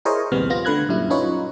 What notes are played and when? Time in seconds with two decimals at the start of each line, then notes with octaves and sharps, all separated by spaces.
0.05 E4 G#4 A#4 C5 C#5 D#5
0.31 A#1 D#2 C3 G3 B3 F6
0.50 B3 F4 A#6
0.65 D3 A3 B4 F#6 G#6
0.89 F#2 A#2 G3 E4
1.10 C#4 D#4 F4 B4 C#5